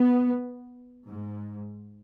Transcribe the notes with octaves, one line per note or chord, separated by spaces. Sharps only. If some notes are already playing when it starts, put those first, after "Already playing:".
Already playing: B3
G#2